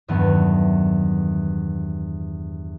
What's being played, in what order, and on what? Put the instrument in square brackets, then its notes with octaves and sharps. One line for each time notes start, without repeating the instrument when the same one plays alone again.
[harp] E2 G2 D#3 F#3 A3 B3